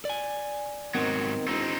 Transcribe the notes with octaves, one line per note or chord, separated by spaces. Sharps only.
D5 G#5
G#2 D#3 F#3 B3 C4
E1 C4 D#4